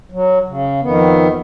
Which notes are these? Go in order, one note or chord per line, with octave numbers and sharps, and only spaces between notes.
F#3
C#3
F2 D#3 B3